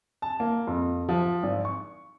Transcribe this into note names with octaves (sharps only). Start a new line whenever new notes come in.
A5
A#3
F2
F3
G#1
C#6